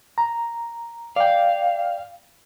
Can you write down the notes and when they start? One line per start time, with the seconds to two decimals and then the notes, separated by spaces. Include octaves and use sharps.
0.18 A#5
1.16 D5 F5 G5